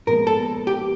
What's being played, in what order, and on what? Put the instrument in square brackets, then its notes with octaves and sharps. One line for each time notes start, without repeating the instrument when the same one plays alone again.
[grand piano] A#2 F3 G#3 B3 [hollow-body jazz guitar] A#4
[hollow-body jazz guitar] A4
G4